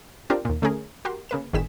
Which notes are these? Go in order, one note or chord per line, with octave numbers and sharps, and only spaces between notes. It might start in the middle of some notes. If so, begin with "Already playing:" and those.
C4 D4 F4 G4 A#4
D#2 A#2
D3 A3 C#4 G#4 A#4
F#4 G4 A#4 C6
C#3 A#3 B4 E7
G1 A2 D#3 G#4 B6 E7